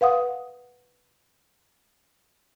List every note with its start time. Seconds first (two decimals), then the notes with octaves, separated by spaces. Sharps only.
0.01 B4 F5 F#5 D#6